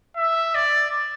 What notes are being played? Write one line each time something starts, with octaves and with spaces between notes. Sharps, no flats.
E5
D5